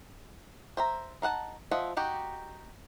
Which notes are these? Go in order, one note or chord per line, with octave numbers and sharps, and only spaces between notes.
C5 E5 A#5
D#4 F5 F#5 A5
F3 F4 D#5 E5 F#5
D#4 F#4 G4